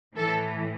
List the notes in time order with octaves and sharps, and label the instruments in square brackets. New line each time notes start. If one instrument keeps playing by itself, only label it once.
[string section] A2 E3 A4